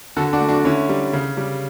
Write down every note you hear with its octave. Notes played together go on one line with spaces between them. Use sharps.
D3 F#4 A4
D4 F#4
A3
D4 F#4
D3 C#4 E4
G3
C#3
G3